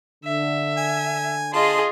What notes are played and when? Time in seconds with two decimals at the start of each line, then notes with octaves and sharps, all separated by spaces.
0.24 D3 E5
0.77 G#5
1.53 F4 G#4 D#5 A5 C6